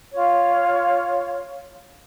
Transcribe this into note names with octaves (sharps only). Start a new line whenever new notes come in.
F4 C#5